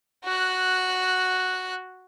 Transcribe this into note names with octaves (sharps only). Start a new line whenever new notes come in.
F#4 F#6